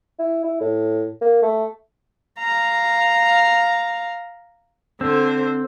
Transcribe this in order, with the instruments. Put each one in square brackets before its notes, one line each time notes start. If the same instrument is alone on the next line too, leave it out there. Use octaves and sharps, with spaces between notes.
[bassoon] E4
E4
A2
A#3
A3
[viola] F5 A#5
[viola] D3 C5 [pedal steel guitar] C4